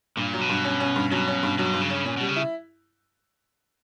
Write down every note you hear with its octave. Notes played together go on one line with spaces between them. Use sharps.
G2 A#2
F#3
B2
G2
C#4
C#4
G2
B2 F#3
C#4
G2
B2 F#3
G2
C#3
C#4
A#2 C#4
B2 G3
C#3
E4